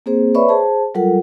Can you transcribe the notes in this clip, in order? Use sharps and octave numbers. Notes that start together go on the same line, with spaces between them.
A#3 C4 G#4 C5
B4 C#5 D5 E5 B5 C#6
G#4 C5 A5
F#3 G3 F4 A4 A#4 F#5